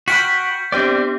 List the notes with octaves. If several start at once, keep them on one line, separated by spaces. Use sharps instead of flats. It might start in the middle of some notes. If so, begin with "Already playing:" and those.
F#4 G5 B5 F6 G6 B6 C#7
B3 C4 D4 G4 C5 D5